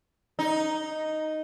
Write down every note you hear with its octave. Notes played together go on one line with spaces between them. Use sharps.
D#4